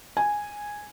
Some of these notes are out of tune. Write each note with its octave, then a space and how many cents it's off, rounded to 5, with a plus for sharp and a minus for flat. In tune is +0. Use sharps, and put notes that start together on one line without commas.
G#5 -5